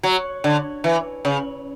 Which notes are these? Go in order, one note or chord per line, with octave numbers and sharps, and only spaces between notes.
F#3
D3
E3
C#3